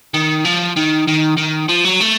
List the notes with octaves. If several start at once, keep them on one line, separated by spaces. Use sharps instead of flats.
D#3
F3
D#3
D#3
D#3
F3
F#3
A3